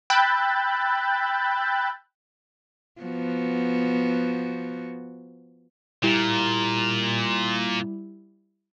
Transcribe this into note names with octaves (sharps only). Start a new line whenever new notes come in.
G5 B5 E6 F#6 G6 A6
F3 B3 F#4
A#2 G3 E4 G4